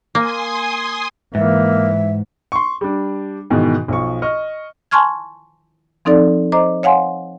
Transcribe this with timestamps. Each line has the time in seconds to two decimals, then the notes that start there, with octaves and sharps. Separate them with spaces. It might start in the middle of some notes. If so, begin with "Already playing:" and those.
0.15 A#3 G#5 C6 D#6
1.35 G#2 E3 A#3 E5
2.52 C6 C#6
2.81 G3 D4
3.50 G#2 B2 D#3 E3
3.88 B1 F3 C#6
4.22 D#5 C#6 F6
4.91 G#5 A5 C6 C#6 F6 G#6
6.05 F3 C4 D#4 A4 D5
6.52 C5 D#5 A#5 D6
6.83 C#5 F5 F#5 G#5 C6